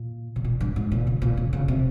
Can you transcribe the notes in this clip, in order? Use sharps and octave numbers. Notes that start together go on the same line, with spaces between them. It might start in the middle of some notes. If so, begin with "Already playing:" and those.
Already playing: A#2
C3
A#2
G2
G#2
A#2
C#3
A#2
C#3
C#3
C3